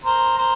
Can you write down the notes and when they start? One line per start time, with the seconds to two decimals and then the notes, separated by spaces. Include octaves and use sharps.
0.05 A#4 C5
0.38 A#4 C5